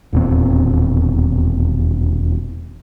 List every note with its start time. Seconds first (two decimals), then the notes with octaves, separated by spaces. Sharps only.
0.13 E1 D#2 A#2 C4